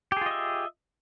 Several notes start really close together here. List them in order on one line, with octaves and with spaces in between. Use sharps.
G4 G#4 F4 D#5 E5